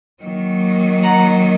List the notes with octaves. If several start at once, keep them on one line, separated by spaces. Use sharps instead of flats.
D#3 F#3 A#3
F#5 A#5